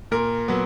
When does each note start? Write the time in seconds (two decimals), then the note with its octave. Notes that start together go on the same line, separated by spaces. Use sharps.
0.11 A#2 A#4
0.48 F#3 B3